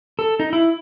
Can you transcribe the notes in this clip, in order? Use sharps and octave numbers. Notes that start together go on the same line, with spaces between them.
A4
D#4
E4